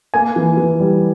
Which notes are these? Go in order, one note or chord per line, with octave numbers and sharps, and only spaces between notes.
A#3 G#5
E3
E3
G3